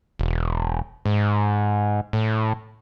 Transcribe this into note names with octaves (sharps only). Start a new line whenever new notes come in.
E1
G#2
A2